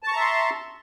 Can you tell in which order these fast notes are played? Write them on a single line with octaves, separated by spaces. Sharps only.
A5 C#6 A#5 E5 C6